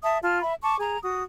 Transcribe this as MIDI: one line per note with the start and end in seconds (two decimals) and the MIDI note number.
0.03 0.18 76
0.03 0.18 81
0.03 0.18 87
0.22 0.41 65
0.22 0.41 81
0.22 0.41 89
0.41 0.54 76
0.41 0.54 83
0.62 0.77 81
0.62 0.77 85
0.62 0.77 86
0.80 0.97 68
0.80 0.97 82
1.02 1.24 66
1.02 1.24 87